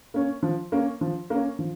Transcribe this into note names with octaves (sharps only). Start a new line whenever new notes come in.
A#3 C#4
F3
A#3 C#4
F3
A#3 C#4
F3